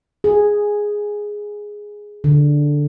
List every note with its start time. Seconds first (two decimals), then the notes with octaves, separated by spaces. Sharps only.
0.24 G#4
2.24 D3